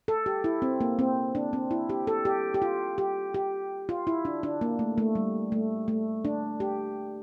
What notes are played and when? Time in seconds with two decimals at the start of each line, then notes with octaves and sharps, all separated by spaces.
0.08 A4
0.26 G4
0.44 E4
0.62 C4
0.81 A#3
0.99 C4
1.35 D4
1.53 C4
1.71 E4
1.90 G4
2.07 A4
2.25 G4
2.54 G4
2.62 F4
2.98 G4
3.34 G4
3.89 F4
4.07 E4
4.25 D4
4.43 D4
4.61 A#3
4.79 A3
4.98 A3
5.15 G3
5.52 A3
5.88 A3
6.25 D4
6.60 G4